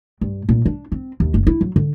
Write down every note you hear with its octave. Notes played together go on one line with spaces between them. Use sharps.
G2
A#2
D4
C4
D#2
F#1
E4
F#3
D3